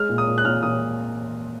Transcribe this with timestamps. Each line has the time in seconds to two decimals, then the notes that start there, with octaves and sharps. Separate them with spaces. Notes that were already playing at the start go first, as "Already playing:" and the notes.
Already playing: G#3 F6
0.09 A#2
0.18 D#6
0.27 A#2
0.38 F#6
0.45 A#2 F6
0.63 A#2 D#6